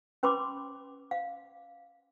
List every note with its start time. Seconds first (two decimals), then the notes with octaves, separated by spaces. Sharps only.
0.23 C#4 B4 B5 C6 D6
1.11 F5